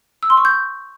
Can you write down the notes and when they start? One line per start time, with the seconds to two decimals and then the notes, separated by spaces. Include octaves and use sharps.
0.23 E6
0.30 C6
0.37 C#6
0.45 G6